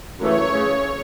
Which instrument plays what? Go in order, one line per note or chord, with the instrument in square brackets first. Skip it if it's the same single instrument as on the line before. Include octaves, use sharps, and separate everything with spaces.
[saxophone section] F#2 C#3 E3 A3 [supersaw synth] C#5
[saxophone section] C#3